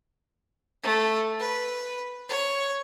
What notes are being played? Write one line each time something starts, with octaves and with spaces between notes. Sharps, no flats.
A3
B4
C#5